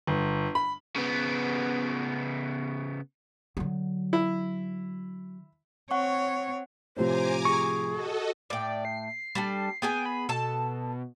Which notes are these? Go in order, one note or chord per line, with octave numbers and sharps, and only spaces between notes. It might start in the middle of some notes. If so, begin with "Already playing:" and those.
G1
B5
C#3 B3
D3 F#3
E4
C4 C#5 F#5 C#6
A2 C3 F3 C5 G#5 A#5 D6
G#4 C#6
F#4 A4 D#5
A2 D5 G5
C7
G3 D4 A4
B3 G#4 G5 G#5
B5
B2 A4 A5